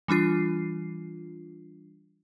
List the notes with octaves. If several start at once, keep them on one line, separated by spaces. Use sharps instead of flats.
E3 G3 D4 F4 C7